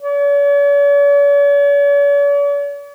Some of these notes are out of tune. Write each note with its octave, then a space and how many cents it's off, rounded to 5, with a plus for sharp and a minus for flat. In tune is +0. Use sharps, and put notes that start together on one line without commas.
C#5 +45